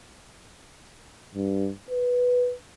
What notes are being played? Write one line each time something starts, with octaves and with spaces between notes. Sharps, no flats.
G2
B4